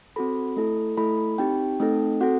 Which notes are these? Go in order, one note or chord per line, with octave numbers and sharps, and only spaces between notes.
C4 F#4 A4 B5
A3 E4 A4
A3 E4 A4 B5
B5
C4 D#4 G4 G5
A3 C4 D#4 A4
C4 F#4 A4 F#5